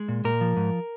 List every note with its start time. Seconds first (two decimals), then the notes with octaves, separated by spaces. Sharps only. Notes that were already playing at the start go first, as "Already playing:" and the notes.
Already playing: G#3
0.08 A#2
0.24 A#2 A#4
0.41 F3
0.57 G#2